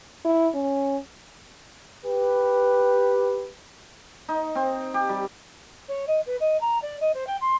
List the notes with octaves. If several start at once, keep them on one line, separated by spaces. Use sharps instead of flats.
E4
C#4
G4 B4
D#4
C4
G4
G3
C#5
D#5
B4
D#5
A#5
D5
D#5
C5
G5
C6